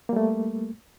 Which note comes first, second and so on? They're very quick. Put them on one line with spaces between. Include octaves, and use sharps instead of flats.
A#3 G3 A3